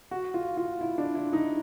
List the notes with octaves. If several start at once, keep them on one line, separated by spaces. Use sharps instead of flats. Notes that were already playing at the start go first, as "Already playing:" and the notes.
F#4
F4
F4
E4
D4
E4
D#4